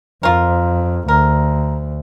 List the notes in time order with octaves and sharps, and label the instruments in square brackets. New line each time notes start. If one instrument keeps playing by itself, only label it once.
[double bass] F2 [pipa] F4 A#4
[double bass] D2 [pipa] A#4